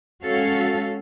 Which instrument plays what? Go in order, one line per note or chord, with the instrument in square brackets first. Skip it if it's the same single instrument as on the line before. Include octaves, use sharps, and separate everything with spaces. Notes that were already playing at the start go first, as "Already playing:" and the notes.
[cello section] G#3 C#4 F#4 A4 F5